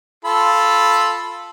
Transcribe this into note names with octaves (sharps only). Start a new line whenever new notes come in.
F4 A4 B5